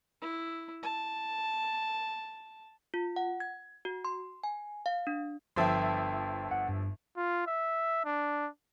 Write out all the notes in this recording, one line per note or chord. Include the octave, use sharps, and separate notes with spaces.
E4
A5
F4
F#5
G#6
F#4
C6
G#5
F5
D4
G1 F3 E5 G5 A5 C6
F#5
G2
F4
E5
D4